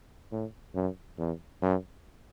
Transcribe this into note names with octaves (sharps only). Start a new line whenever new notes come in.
A2
F#2
E2
F#2